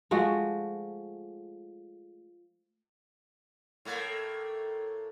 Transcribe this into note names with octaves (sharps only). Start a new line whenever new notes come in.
F3 G#3 A3 F#4
A2 A3 A#3